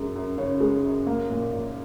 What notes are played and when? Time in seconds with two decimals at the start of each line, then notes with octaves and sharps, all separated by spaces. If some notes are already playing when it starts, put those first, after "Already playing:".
Already playing: F#2 G#3
0.15 F#2
0.38 C#3 C#5
0.61 G#3
0.85 F#2
1.07 A#3
1.30 A#2
1.53 A#2